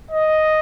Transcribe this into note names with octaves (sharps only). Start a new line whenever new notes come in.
D#5